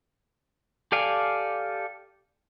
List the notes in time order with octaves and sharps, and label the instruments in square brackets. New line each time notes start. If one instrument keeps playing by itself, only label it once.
[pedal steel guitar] G4 A4 D5 F5 G#5